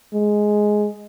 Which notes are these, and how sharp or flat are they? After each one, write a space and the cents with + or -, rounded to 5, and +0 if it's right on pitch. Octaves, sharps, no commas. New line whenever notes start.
G#3 +5